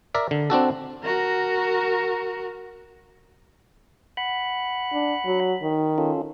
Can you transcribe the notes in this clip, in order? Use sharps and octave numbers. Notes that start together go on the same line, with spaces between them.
A#4 D5 E5
D3
C4 D4 F#4 A4
F#4 A#4
F#5 B5 F#6
D4
F#3
D#3
C#4 F4 A4